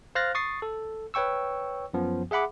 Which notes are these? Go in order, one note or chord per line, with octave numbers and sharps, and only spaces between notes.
C5 F5 F6 F#6 A6 A#6
C#6 D#6 A6 C7
A4
B4 C#5 G5 C#6 E6
F#2 F3 B3
G#4 E5 F#5 B5 D6